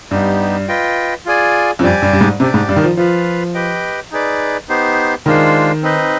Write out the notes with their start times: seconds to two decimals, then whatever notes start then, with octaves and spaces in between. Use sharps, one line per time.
0.11 G2 B3 D#4 G4
0.68 F4 B4 D#5 G5
1.25 F4 G#4 D5 G#5
1.79 F2
1.83 G2 G4 D5 G#5
2.02 G2
2.13 G2
2.21 G#2
2.40 C3 D4
2.42 G4 D5
2.54 G#2
2.69 G2
2.76 D#3
2.84 F3
2.97 F3 F4 B4 F5
3.54 G4 B4 D#5 G5
4.12 D#4 G#4 B4 D5
4.69 B3 D#4 G4 C5
5.26 D#3 G#3 D4 F4 C5
5.83 C4 D#4 B4 D#5